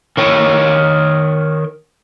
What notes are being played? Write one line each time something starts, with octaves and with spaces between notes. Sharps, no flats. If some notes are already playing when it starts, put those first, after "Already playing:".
D#3 C#5 G5